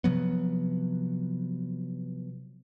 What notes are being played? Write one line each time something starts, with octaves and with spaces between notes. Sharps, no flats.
C3 F3 F#3 B3